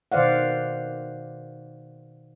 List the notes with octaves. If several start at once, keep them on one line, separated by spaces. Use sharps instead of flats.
B2 D#3 C5 D5 F5 F#5